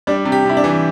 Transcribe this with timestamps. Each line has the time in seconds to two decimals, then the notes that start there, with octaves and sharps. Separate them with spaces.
0.07 G3 D4
0.25 C3
0.32 G4
0.45 C3 E4
0.57 D4
0.64 E3